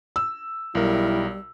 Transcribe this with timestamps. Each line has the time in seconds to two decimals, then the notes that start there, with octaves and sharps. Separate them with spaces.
0.16 E6
0.75 B1 G3 E4 A#4